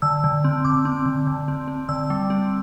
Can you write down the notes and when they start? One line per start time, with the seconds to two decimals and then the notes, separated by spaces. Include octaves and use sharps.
0.02 D3 E6
0.24 D3
0.44 C4
0.65 D3 D6
0.85 C4
1.06 D3
1.27 D3
1.48 C4
1.68 C4
1.89 D3 E6
2.10 G3
2.30 C4